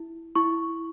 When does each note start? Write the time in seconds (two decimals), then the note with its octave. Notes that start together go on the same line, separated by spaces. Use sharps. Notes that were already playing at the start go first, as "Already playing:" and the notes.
Already playing: E4
0.35 E4 C#6